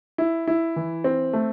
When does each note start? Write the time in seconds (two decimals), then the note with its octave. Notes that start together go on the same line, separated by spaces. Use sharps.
0.18 E4
0.47 E4
0.76 E3
1.04 C4
1.33 A3